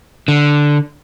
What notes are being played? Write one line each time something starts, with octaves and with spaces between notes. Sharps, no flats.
D3